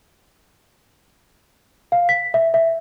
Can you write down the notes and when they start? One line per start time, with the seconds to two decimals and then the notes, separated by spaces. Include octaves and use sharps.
1.92 F5
2.09 B6
2.34 E5
2.54 E5